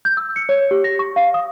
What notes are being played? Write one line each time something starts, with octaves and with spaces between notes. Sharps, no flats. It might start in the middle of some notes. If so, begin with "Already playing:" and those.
G6
E6
C#7
C#5
G4
A#6
C#6
F5
D#6